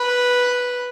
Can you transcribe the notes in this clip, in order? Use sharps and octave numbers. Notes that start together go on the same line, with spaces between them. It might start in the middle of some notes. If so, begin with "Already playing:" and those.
Already playing: B4